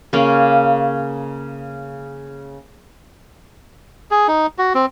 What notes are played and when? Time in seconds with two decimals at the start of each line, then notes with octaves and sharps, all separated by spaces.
0.13 C#3 A#3 C#4
4.11 G#4
4.28 D#4
4.58 F#4
4.75 C4